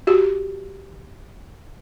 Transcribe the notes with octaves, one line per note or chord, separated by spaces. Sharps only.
F#4 G4